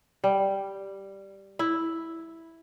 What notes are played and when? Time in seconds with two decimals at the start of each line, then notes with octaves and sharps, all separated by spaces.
0.24 G3
1.59 E4